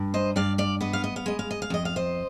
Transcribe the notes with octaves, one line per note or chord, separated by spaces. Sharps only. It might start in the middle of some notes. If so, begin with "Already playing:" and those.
Already playing: G2
C5 D#5
G2 D5 F5
D5 F5
B3 D#5
F5
D#5
F5
G#3 D#5
F5
D#5
F5
F2 D#5
F5
C5 D#5